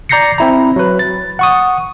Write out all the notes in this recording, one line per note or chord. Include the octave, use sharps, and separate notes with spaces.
D5 A#5 G6 A#6 C7 C#7
C4 E4 A#5
F#3 B4
A6
F#5 C#6 D#6